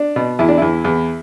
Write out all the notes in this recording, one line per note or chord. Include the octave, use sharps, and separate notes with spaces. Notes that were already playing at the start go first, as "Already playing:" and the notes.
Already playing: D4
B2
E2 E4
D4
E2 E4
E2